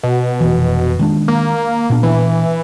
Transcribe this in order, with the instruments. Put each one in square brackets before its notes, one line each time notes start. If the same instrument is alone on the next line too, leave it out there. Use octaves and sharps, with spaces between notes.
[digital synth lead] B2
[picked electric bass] F1 E3
D#3 G#3 D4
[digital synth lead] A#3
[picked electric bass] A#2 B3 D4
[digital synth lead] E3